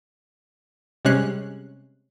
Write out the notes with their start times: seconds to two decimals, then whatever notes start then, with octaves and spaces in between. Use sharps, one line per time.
1.05 C3 G3 G#3 C#4 F#6 C7